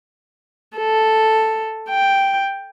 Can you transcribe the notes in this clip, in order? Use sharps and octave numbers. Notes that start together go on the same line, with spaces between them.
A4
G5